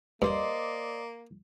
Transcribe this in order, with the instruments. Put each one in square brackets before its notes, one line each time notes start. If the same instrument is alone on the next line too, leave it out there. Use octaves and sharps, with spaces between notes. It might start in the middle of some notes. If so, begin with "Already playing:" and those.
[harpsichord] G2 [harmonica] A#3 [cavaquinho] C5 D5 D#5